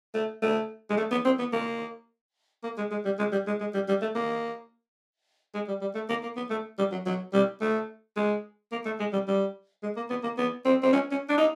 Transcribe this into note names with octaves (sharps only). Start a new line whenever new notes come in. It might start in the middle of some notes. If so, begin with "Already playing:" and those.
A3
A3
G#3
A3
B3
C4
B3
A#3
A#3
G#3
G#3
G3
G#3
G3
G#3
G#3
G3
G3
A3
A#3
G#3
G3
G3
A3
A#3
A#3
B3
A3
G3
F#3
F#3
G3
A3
G#3
A#3
A3
G#3
G3
G3
G#3
A#3
B3
A#3
B3
C4
C4
C#4
C#4
D4
D#4